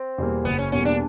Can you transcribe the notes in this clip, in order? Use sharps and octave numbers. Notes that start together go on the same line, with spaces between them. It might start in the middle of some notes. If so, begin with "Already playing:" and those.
Already playing: C4
E2 B2 G3 A#3
F#1 B3
C#4
E2 B2 G3 A#3 C#4
D4